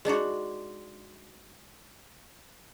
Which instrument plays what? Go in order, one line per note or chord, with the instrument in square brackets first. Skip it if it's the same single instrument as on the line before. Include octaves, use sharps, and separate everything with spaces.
[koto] G#3 D4 D#4 F#4